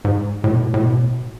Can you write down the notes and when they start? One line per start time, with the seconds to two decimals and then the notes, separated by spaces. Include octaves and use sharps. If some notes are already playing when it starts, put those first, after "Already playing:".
0.05 G#2
0.44 A2
0.51 B2
0.59 A2
0.74 A2
0.81 B2